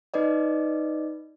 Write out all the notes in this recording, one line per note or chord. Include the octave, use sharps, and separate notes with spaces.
D#4 B4 D5 D#5